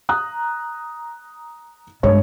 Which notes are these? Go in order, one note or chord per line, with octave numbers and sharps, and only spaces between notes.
A#5 D#6 F#6
G2 G#3 C#5